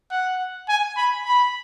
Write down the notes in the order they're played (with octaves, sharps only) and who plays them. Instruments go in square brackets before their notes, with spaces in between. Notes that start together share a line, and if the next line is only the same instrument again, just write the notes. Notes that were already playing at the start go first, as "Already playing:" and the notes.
[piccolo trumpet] F#5
G#5
B5
B5